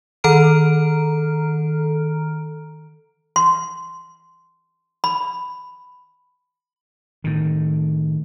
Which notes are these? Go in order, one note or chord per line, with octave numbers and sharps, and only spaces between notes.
D#3 A4 A#5 F6 D7
C6
B5
A2 D#3